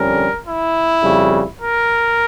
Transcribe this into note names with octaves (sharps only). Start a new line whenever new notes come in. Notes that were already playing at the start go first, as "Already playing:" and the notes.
Already playing: F2 D3 G3 C#4 A#4
E4
F2 C#3 G3
A#4